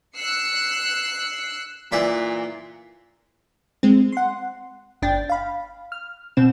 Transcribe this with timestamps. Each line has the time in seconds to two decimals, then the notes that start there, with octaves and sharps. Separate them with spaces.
0.16 E6 F#6 C7 C#7
1.92 A#2 E3 D5 B5
3.83 G#3 C4
4.12 F#5 C6
5.02 G1 D4 G5 A6
5.29 F5 B5
5.92 F6
6.37 B2 C4 E7